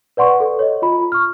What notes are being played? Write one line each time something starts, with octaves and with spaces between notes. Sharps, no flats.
B4 D5 F#5 C6 C#6
A4
C#5 D#5
F4 B5
C#6 F6